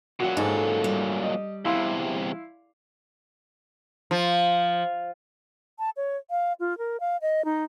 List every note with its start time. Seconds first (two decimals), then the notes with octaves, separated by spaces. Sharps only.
0.20 A#2 F#3 F#4 F#5
0.37 G#2 A4
0.84 G3
1.23 D#5
1.65 E2 C3 E4 F5 C6
4.11 F3
5.78 A5
5.97 C#5
6.30 F5
6.60 F4
6.78 A#4
7.00 F5
7.22 D#5
7.45 D#4